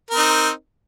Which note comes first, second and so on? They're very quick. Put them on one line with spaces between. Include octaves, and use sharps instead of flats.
A#4 C4 D#4